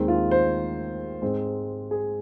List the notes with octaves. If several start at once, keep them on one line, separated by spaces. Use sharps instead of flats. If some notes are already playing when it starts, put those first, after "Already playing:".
Already playing: D#2 D#3 G#3 C4
F4
C5
G#2 G#3 C4
G#4